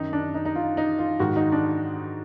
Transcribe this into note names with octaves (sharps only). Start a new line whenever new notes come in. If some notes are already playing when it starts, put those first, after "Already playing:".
Already playing: F#2 D#3 D#4
D4
D#4
D#4
F4
D#4
F4
G#2 D#3 F#4
D#4
D4